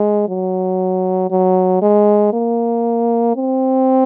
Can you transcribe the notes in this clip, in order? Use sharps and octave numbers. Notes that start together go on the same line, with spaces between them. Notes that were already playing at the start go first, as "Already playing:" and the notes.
Already playing: G#3
F#3
F#3
G#3
A#3
C4